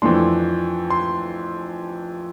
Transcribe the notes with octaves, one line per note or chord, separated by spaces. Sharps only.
F2 E3 A3 D4 C6
C6